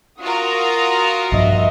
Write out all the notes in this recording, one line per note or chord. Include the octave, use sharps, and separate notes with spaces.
F4 F#4 A#4 D#6
A#1 G2 F3 D#5 E5